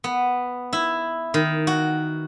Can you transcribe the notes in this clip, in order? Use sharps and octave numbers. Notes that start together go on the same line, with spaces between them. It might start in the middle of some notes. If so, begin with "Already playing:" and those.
B3
E4
D#3
F#4